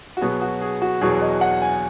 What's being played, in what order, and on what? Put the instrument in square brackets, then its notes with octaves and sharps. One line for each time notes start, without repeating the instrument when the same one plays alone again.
[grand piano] F#4
B2 F#3 B3 G#4
F#4
G#4
F#4
E2 B2 F#3 G#4
D#5
F#5
G#5